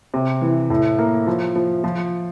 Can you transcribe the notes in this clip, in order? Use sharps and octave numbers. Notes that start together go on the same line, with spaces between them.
C3
E3
A2
A#3
F3
F3
F3